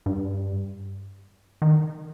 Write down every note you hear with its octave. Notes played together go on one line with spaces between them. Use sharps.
G2
D#3